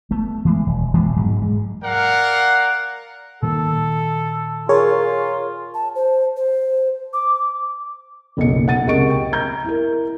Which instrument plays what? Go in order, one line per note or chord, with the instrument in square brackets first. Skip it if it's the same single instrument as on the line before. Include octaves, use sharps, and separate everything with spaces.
[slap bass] A3 B3
E3 G#3
E1
E1 E3 G#3 B3
G#2 F#3 G#3
G#3
[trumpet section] A#4 D5 F5 F#5
[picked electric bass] A#2 D#3 A#3 [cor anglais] A4
[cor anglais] F4 [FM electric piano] G#4 A#4 C#5
[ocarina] A5
C5
C5
D6
[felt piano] F#1 B1 A#2 C#7
F#5 A6 D#7
C#2 C3 A#4 D#5 C#6 D7
G5
A#5 G6
E4 A#4